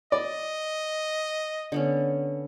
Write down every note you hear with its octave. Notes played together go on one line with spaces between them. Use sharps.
D5 D#5
D3 B3 C#4